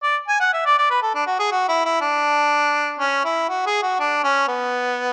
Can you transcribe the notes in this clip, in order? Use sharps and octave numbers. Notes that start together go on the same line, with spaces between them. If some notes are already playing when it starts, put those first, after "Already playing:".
D5
G#5
F#5
E5
D5
D5
B4
A4
D4
F#4
G#4
F#4
E4
E4
D4
C#4
E4
F#4
G#4
F#4
D4
C#4
B3